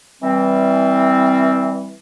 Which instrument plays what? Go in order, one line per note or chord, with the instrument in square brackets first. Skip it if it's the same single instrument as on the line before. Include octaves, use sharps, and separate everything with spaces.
[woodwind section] E3 G3 C4